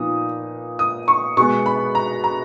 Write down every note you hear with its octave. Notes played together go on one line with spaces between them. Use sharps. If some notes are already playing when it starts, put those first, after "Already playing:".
Already playing: A#2 F3 B3 D#4 D#6
D#6
C#6
B2 G#3 B3 C#6
B5
A#5
A#5